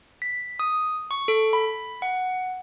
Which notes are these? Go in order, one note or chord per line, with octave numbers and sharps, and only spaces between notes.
B6
D#6
C#6
A4
B5
F#5